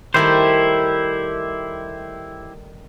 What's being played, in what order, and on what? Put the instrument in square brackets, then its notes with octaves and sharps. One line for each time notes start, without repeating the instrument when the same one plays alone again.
[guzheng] D#3 G3 A3 [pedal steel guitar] E4 G4 C5